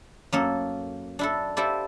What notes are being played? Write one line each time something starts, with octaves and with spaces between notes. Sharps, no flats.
F#2 A#3 A4
D4 E4 A4
E4 F4 G4 A4 C5 D5